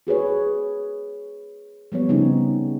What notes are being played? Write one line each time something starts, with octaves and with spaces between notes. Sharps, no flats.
F#4 G#4 B4 C#5
F3 G3 B3 C#5
C#3 F3 C4 C#4 D#4